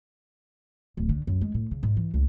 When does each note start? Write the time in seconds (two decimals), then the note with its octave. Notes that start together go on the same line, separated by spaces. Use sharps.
0.97 D1
1.09 D3
1.27 F#2
1.41 G#3
1.54 A2
1.71 C#3
1.83 G#2
1.97 E3
2.14 C#2